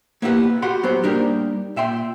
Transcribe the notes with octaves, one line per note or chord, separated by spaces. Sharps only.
A#3 B3 E4 G4 B4
F#4 G4 F#5 B5 C6
F#3 B3 G4 C5
G3 A#3 D4 D#4 G4 A#4
A#2 E5 G5 C6